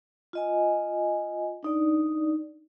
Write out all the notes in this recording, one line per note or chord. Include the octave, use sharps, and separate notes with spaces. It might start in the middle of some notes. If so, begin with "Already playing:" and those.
F4 D#5 G#5
D4 D#4 D5